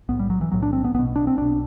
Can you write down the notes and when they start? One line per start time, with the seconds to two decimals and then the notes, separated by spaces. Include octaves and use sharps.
0.09 B1 A2 B3
0.19 G3
0.30 F#3
0.41 E3
0.52 B1 A2 F#3
0.63 D4
0.73 C4
0.84 B3
0.94 B1 B2 B3
1.16 D4
1.27 C4
1.37 B1 B2 D4